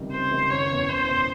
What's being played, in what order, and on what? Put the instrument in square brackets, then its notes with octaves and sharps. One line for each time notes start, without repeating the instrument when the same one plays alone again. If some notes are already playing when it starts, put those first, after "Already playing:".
Already playing: [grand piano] C#2 C3 D#3 G3
[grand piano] C#2 [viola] C5
[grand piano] C3 D#3 G3
[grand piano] F#1 [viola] C#5
[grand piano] E2 B2
[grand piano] F#1 [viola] C5
[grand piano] B2